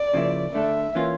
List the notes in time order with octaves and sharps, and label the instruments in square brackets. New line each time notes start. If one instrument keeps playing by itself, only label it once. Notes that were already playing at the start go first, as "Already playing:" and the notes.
Already playing: [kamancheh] D5
[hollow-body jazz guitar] C#3 F3 A#3 E4
[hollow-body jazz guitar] D3 A3 D4 A4 [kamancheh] E5
[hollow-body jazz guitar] E3 A#3 C#4 F4